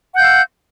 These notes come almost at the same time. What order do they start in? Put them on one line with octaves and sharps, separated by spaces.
F#5 G6 F5 E6